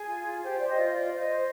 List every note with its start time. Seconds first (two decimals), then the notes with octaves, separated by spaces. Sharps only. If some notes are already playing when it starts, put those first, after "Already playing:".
Already playing: G#4 G#5
0.08 F4
0.26 F4
0.43 G4 C5 G5
0.58 C5 D5
0.68 D#5
0.77 F4
0.93 F4 D5
1.10 C5
1.19 D#5
1.27 C5